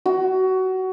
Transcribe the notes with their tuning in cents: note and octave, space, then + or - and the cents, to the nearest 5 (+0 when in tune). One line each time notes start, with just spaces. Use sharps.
F#4 +20